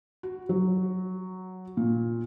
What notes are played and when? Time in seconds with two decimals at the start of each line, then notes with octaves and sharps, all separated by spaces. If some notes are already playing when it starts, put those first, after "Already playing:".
0.23 F#4
0.49 F#3
1.77 A#2